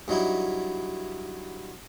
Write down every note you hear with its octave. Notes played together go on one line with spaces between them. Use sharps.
G2 F#3 D#4 E4